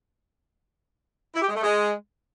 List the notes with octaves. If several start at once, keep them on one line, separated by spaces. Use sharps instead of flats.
E4
G4
G#3
A3
G#3